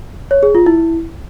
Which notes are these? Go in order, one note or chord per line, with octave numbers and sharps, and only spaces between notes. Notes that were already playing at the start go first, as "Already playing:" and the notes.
C#5
G#4
F4
E4